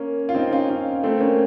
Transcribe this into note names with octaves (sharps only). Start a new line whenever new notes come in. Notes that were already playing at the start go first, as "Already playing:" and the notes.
Already playing: A#3 C#4
F4
C4 D#4
C#4 F4
C#4 F4
A3 C4
A#3 C#4